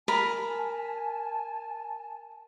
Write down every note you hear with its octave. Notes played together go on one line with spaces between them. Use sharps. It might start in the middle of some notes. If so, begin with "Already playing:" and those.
A#4 G#5 A5 B5